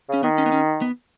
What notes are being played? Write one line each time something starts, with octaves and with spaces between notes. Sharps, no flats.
C#3 C#4
D#3 B3
C#4
B3
C#4
B3